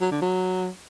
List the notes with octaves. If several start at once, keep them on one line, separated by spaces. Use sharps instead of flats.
F#3
D3
F#3